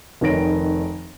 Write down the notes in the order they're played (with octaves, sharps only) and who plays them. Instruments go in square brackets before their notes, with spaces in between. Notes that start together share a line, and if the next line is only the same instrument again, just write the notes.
[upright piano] F1 D#3 C#5 A#6 D7